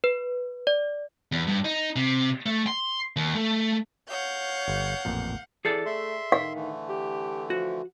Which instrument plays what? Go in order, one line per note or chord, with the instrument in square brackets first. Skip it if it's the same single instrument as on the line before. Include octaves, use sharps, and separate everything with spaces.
[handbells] B4
D5
[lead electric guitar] E2
G2
D#4
C3
A3
C6
D#2
A3
[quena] C#5 [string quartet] F5 G6 [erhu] F#5
[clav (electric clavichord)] G1
A1 F2 A#2
[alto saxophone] E3 [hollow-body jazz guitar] G#4 A4 D5
[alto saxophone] A3 [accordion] E5 C6
[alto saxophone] D#3 [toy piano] F5
[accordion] D3 E3 A3
[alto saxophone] G4
[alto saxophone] F3 [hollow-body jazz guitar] F#4